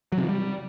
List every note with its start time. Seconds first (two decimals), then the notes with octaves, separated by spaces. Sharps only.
0.12 F#3
0.18 C3
0.23 F3
0.29 G3